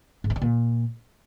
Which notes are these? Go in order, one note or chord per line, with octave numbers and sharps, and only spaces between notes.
G#2
F#3
G3
A#2